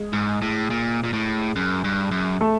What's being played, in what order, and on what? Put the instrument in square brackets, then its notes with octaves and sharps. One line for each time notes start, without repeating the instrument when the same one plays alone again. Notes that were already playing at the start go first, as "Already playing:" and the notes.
Already playing: [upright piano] G#3 G#4
[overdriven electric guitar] G#2
A2
A#2
A#2
A2
F#2
G2
F#2
[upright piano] A3 A4